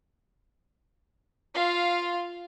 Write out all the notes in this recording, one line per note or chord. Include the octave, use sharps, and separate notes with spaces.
F4 F5